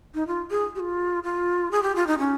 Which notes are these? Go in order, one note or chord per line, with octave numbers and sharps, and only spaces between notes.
D#4
F4
G#4
G4
F4
F4
G#4
G4
F4
D#4
C#4